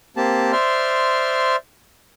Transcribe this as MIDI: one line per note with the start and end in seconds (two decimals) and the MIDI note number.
0.17 0.52 58
0.17 0.52 60
0.17 0.52 67
0.17 0.52 81
0.52 1.56 72
0.52 1.56 74
0.52 1.56 76
0.52 1.56 84
0.52 1.56 89